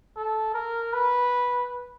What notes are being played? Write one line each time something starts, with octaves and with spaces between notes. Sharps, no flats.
A4
A#4
B4